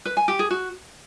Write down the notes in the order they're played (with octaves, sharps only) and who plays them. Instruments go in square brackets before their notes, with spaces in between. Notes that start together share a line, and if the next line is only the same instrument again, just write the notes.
[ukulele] B4
G#5
G4
G#4
F#4